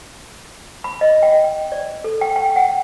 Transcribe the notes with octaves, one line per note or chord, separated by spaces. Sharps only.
B5
D#5
G5
D5
A4
G5
G5
F#5